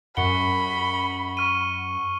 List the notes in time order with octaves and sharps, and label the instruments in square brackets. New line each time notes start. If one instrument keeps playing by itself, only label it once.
[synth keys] F#2 F#5 [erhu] B5 [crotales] C#6 C#7 G7
[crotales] C#6 F6 D#7